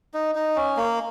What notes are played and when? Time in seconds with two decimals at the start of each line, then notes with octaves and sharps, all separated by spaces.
0.14 D#4
0.35 D#4
0.56 C#4
0.77 A#3